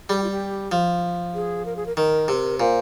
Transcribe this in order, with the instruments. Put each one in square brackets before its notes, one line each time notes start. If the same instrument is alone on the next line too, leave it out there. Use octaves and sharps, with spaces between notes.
[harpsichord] G3 [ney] G#4
[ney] G4
F4
G4
[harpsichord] F3
[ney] G#4
A#4
G#4
A#4
[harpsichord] D#3 [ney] A#4
[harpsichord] C3
[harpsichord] A#2 [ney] C5